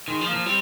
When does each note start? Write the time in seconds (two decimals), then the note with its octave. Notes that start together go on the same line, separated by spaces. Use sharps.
0.08 D#3 G#3
0.21 F3
0.27 A#3
0.34 F3
0.46 G3 C4